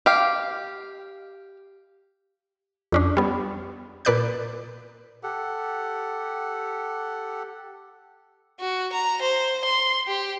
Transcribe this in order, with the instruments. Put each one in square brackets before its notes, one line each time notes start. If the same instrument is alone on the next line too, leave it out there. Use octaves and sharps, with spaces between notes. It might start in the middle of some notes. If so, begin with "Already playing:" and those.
[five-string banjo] G4 F5
[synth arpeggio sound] F2 C#4 D4
G3 B3
A#2 A#3 B4 D5 F#6 G6
[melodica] G4 A4 F#5
[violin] F#4
A#5
C5
C6
G4